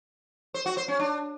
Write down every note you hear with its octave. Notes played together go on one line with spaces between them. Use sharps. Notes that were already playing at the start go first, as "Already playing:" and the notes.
C5
F#4
C5
C#4
D4